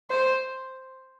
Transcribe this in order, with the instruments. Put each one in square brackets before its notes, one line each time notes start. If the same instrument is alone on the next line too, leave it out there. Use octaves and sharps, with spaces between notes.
[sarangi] C5